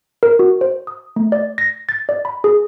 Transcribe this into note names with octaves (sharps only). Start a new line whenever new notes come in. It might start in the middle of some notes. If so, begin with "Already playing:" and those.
A#4
F#4
C5
D#6
A3
D5
A#6
A6
D5
B5
G#4